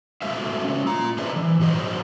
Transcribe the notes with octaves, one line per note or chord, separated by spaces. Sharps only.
G#3 A3 F#4 C5 E5 F5
G#3 C#4
F4 A#5
D4 G#4 B4 C5 D5 E5
E3
G#2 F#3 G#4 C5 D#5